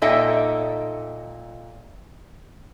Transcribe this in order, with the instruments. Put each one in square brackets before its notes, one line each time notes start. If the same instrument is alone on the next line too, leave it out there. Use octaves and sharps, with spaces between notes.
[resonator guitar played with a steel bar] A#2 D#4 A4 D#5 E5 G5